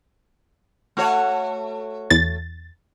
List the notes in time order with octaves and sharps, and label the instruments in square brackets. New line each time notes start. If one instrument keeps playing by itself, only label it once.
[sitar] A3 F#4 C#5
[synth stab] E2 A6